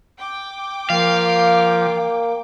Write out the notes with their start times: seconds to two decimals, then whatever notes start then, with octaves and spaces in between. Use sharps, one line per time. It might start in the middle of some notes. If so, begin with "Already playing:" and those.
0.18 G5 D6
0.90 F3 A#3 F5